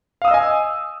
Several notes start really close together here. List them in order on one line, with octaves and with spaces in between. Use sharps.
F5 D#6 E6 D#5 G#5